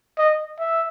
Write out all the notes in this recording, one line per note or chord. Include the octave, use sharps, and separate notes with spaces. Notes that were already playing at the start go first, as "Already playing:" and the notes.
D#5
E5